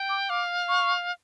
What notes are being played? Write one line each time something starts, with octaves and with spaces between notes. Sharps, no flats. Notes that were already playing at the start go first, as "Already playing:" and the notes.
Already playing: G5
D6
F5 D6
C#6